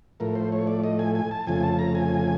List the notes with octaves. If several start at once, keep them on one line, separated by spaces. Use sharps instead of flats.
A2 F3 A3 A#4
C5
C#5
D5
D#5
G#5
G#5
A5
F2 C#3 F3 A3 G#5
A5
A#5
G#5